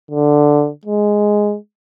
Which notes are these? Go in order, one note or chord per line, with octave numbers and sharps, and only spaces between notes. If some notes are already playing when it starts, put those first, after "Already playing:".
D3
G#3